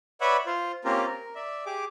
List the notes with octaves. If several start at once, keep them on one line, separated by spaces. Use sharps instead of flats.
B4 C#5 D5 E5 F#5 B5
F4 C5
A#3 C4 C#4 F4 G4 A#4
A#4
D5 E5
G4 G#4 D6